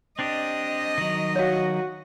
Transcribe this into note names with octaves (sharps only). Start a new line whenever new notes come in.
C4 D4 G4 D#5
D#3 F#3
F#4 C#5 F5